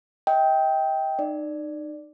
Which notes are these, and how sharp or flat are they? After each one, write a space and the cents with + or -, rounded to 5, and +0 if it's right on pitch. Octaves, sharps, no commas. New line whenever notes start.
D#5 +40 G5 +0
D#4 -30 D5 +0